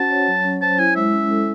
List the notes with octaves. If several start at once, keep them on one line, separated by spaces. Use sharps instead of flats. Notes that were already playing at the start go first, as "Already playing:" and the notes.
Already playing: C#4 F#4 C5 F#5 A5
C#5
F#3
C#4
C5 A5
E4 G#5
G#3 E5
C#4
A4